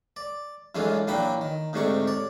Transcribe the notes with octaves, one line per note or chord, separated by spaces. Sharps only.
D5
F#2 E3 G#3 A3 D4 F4
A#2 E3 F#3 D4 G5 B5
D#3
D2 G#2 C3 A3 D4 C#6
C#5 D5